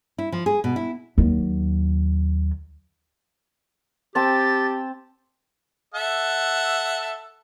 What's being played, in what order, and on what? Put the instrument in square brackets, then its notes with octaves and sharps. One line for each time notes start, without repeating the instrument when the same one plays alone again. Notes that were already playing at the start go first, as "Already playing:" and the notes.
[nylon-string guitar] E4
F3
G#4
B2
E4
[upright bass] D#2 F#3
[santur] C4 A5 [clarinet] G4 [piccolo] A6
[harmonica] A4 E5 F#5